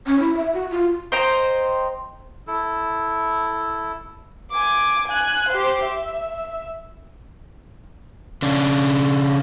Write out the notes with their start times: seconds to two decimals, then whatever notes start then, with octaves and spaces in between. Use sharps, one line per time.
0.07 C#4
0.19 E4
0.37 E5
0.54 F#4
0.71 F4
1.12 C5 D#5 G5 A#5
2.47 E4 A4
4.51 G#5 D6
5.06 G#5 F#6
5.49 G4 C5
5.84 E5
8.42 C#3 D4